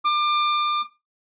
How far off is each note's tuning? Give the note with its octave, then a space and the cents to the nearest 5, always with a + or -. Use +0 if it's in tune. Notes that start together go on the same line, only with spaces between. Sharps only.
D6 +30